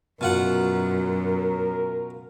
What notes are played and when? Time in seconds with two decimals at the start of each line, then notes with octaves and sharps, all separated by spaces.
0.21 F#2 B2 F4 A#4 F#5